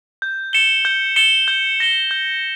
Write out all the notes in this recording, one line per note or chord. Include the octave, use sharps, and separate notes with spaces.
G6
C#7 E7 G7
G6
C#7 E7 G7
G6
A#6 E7 G7
G6